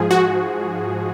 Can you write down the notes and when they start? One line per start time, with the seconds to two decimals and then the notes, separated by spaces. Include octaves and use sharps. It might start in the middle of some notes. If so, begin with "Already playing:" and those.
Already playing: G#2 F3 G#4
0.11 F#4